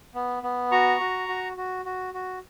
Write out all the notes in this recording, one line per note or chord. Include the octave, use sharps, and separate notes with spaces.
B3
B3
F#4 A#5 C#6
F#4
F#4
F#4
F#4
F#4